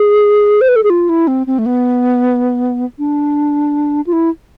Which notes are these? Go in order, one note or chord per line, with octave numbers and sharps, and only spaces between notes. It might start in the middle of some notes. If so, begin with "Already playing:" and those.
Already playing: G#4
C5
B4
A4
G#4
F4
E4
C4
C4
A3
B3
D4
F4
E4